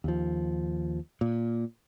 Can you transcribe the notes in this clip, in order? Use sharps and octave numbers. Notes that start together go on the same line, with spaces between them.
D#2 F3
A#2